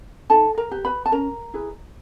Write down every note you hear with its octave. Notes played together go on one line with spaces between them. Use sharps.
D#4 A4 A5
A#4 A#5
G4 B4
B4 B5
A5
C#4 A#4 A#5
E4 G#4 B4